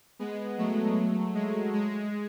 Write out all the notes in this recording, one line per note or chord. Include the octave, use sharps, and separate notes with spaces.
G#3 B3
F#3 A3
G#3
G#3